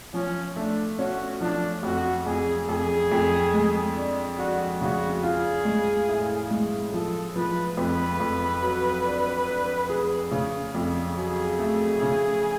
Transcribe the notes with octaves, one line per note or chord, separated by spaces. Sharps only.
F3 C#4
A3 D4
C#4 F#4
F3 D4
F2 F#4
F2 G#4
F2 G#4
F2
G#3
D4
D4 F#4
C#3 F#4
F4 G#4
G#3
A2
G#3
F3 A4
F3 B4
F2 B4
F2
F#3
D4
D4
G#4
C#3
F2
F#3 G#4
A3
C#3